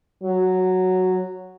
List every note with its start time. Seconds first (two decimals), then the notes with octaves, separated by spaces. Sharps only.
0.23 F#3